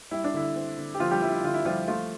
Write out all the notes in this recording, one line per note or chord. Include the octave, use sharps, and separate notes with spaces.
G3 E4
D4
D3 E4
C4
D3
G4
D3 F3 F4
G3 G4
G3 E4
E4
D3 F4
E4
F3 G3 F4
F3 A3 F4